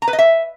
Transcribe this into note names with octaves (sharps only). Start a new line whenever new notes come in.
A#5
B4
D#5
E5